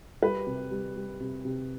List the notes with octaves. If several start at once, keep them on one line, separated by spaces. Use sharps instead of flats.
G3 B4
C3
G3
G3
C3
C3